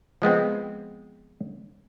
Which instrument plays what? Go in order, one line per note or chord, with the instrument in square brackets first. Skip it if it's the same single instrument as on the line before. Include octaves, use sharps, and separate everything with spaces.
[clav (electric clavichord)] F3 G#3 B3 C4